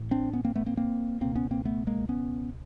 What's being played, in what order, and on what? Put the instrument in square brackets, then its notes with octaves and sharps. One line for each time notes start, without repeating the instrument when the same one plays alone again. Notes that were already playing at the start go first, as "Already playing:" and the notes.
Already playing: [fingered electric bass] A1 A2
C4 D4
B3 C#4
A#3 C4
A3 B3
A#3 C4
A#3 C4
C#2 B2 A#3 C4
B3 C#4
A#3 C4
A3 B3
G#3 A#3
B3 C#4